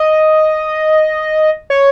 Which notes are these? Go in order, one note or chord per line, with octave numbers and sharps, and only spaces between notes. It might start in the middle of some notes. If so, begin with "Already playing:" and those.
Already playing: D#5
C#5